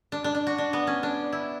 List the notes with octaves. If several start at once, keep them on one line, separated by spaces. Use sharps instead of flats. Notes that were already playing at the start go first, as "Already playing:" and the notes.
D4
D4
D4
F#4
D4
B3
C#4
D4
E4